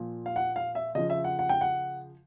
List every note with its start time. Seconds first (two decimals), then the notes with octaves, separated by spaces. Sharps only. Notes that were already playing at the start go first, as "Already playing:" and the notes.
Already playing: A#2 F3
0.26 F5
0.36 F#5
0.56 F5
0.75 E5
0.95 C#3 F3 D#5
1.10 E5
1.24 F#5
1.39 F#5
1.49 G5
1.61 F#5